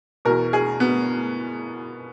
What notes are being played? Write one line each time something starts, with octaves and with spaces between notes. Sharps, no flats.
E2 B2 A#4
G#4
B3